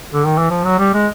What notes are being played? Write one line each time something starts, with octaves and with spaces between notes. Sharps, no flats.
D3
D#3
E3
F3
F#3
G3
G#3